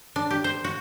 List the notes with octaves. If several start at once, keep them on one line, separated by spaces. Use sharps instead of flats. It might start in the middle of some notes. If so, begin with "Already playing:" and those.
D4
G4
C5
F#4